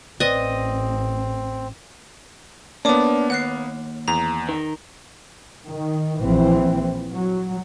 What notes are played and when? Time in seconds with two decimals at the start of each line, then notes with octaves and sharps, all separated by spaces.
0.20 A1 C4 B4 D5 D#5
2.85 A#3 B3 D4 C#5 D6
3.30 D#2 F#5 F#6 C7
4.08 E2 A#5
4.49 D#3
5.66 D#3
6.21 A#1 E3 C4
7.13 F#3